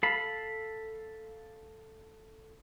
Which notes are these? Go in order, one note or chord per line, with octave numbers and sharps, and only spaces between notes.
A4 F5 B5